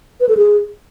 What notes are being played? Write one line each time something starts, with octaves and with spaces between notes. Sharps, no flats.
B4
A4
G#4